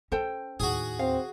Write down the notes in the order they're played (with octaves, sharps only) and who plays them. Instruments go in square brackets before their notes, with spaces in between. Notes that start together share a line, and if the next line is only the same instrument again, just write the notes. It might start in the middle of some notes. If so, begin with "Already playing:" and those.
[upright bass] C#4 [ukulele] A4 C5 G5
[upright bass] D#2 A2 [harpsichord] F#4 G#4
[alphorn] C4 [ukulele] F5